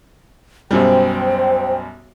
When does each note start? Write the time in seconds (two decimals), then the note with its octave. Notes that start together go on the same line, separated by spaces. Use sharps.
0.71 B1 F#2 G3 C5 G5